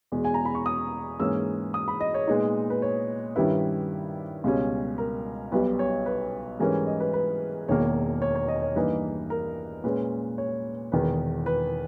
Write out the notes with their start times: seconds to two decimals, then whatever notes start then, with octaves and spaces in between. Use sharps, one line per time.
0.12 E2 B2 G#3
0.25 G#5
0.34 A#5
0.45 B5
0.55 C#6
0.66 D#6
1.20 G#2 E3 A#3 C#4 E6
1.74 D#6
1.88 B5
2.01 D#5
2.14 C#5
2.27 A#2 G#3 B3 D#4
2.70 B4
2.82 C#5
3.36 G2 D#3 G3 C#4 E4 B4
4.44 C#2 B2 G3 C#4
4.98 A#4
5.52 B1 B2 G3 B4
5.79 C#5
6.06 B4
6.60 G#2 E3 G3 C#4 A#4
6.87 D#5
7.00 B4
7.14 B4
7.68 E1 E2 D#3 A#3 C#5
8.22 C#5
8.35 C#5
8.48 D#5
8.62 C#5
8.75 G2 E3 A#3 D#4 B4
9.30 A#4
9.84 A#2 G#3 C#4 B4
10.38 C#5
10.92 E1 E2 D#3 B4
11.46 B4